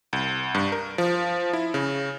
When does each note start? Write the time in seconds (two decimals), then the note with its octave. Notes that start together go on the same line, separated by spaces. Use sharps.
0.13 C2
0.55 G2
0.72 A#4
0.98 F3
1.53 E4
1.74 C#3